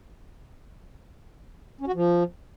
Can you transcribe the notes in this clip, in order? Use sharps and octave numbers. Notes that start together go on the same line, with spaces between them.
C#4
F#4
F3